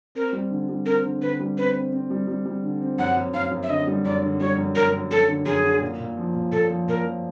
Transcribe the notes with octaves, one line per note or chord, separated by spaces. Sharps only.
C4 A#4
G3
D3
G3
C4 A#4
D3
D3 B4
G3
C4 B4
C4
C4
G3
G3
G3
D3
C4
F#2 F#5
F#2
F#2 F5
F#2
E5
D3 D#5
G3
F#2 D5
D3
G3 C#5
F#2
F#2 A#4
F#2
F#2 A4
D3
F#2 G#4
D3
A#2
A#2
F3
A#2
A#2 A4
F3
A#2 A#4
F3